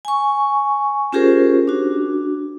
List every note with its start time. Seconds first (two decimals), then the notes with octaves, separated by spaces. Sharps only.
0.05 G#5 C#6
1.13 C#4 F4 G4 G#4 A#4 C5
1.67 D4 F#4